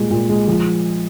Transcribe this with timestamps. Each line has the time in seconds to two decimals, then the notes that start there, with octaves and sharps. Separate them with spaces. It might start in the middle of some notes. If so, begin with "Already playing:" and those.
Already playing: A#2 G3 G#3
0.11 A#2
0.29 G#3
0.48 F3